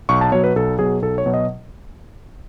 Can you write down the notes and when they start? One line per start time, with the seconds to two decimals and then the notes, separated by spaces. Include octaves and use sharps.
0.09 B1 C#6
0.21 A5
0.32 B2 F#3 C#5
0.44 B4
0.56 B1 A4
0.79 B2 F#3 G#4
1.02 B1 A4
1.18 C#5
1.26 B2 F#3
1.34 D#5